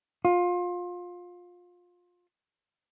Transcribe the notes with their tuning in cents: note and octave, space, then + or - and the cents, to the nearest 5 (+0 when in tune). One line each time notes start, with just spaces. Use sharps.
F4 +25